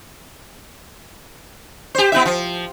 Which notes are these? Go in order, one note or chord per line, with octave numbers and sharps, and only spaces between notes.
G4 C5
B3 E4 E5
F3